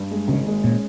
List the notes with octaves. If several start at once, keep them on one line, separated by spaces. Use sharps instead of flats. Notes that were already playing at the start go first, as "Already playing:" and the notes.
Already playing: G2
G#3
G#1 C#3
G#3
A#2 C#4